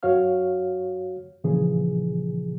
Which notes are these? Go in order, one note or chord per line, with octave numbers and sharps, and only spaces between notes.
F#2 F#4 C#5 F5 F6
A#2 C#3 E3 F3 G#4